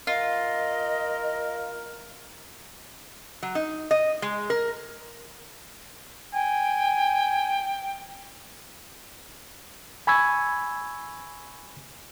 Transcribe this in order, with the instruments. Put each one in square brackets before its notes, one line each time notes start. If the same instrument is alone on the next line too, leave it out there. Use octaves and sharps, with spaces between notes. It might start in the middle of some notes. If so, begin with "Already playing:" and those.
[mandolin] F4 [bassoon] A#4 [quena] D#5
[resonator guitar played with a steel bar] F#3
D#4
D#5
G#3
A#4
[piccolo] G5 [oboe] G#5
[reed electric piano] G#5 B5 C#6 E6 G#6